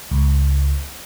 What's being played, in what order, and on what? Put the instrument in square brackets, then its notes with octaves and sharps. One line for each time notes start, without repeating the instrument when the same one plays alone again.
[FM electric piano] C#2